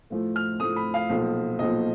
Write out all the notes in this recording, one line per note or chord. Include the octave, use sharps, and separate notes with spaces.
A2 F3 A3
F6
A2 F3 A3 D#6
B5
F5
B1 A#2 F3
B1 A#2 F3 D#5